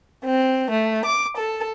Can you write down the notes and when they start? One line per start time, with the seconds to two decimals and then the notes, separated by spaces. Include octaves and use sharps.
0.24 C4
0.71 A3
1.05 D6
1.37 A4